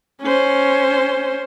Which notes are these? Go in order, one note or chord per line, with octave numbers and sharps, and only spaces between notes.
C#4 C5